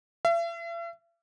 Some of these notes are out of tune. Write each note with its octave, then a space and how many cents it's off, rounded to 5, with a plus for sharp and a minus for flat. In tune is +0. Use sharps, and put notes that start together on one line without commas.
E5 +45